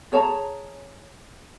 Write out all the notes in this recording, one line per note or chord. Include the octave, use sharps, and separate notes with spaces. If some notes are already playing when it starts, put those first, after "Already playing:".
G#4 C#5 A5 A#5